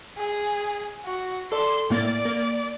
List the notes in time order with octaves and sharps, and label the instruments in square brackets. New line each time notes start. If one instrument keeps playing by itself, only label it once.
[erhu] G#4
F#4
[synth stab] A4 D5 [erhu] C6
[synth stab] A2 A#3 A6 [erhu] D5
[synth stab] A#3